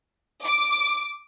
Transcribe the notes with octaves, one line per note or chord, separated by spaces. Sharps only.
D6